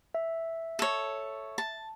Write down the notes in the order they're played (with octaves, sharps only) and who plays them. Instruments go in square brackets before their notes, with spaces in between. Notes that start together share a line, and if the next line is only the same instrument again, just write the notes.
[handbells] E5
[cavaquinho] A4 C#5
A5